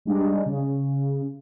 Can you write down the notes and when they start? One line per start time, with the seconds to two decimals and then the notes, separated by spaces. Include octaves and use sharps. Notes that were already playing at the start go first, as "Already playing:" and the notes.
0.05 G3 G#3 D4 D#4
0.46 C#3